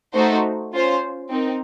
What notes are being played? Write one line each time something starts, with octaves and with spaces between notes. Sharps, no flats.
A3 D#4 F#4 C5
C#4 F4 C5
C4 D#4 A#4